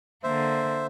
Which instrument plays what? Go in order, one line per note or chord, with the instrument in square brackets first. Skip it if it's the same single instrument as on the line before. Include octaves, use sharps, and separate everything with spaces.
[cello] D3 A#3 [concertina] C5 E5